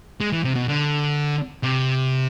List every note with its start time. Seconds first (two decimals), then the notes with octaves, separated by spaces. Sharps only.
0.21 G#3
0.32 E3
0.44 C3
0.56 B2
0.68 D3
1.63 C3